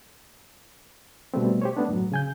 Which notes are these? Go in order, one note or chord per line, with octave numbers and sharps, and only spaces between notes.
B2 G3 A3 C4
G4 C5 C#5
A3 B3 D4
F#2 A2 F#3
C#3 G#5 G6